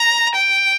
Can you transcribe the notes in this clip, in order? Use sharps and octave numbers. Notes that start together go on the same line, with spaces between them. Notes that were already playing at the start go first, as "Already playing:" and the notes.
Already playing: A#5
G5